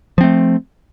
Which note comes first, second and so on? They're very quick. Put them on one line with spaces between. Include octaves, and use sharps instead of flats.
F3 C4 A3